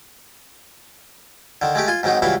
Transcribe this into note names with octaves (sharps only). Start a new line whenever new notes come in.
D3 D#3
G#3 A3 G4
F4 G#5 C6
G#2 D#3 F#3 C4 D#4
C#2 G2 E3 F#3 E4 F5